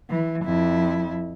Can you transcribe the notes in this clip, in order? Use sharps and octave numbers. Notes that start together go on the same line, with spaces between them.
E3
F2 E4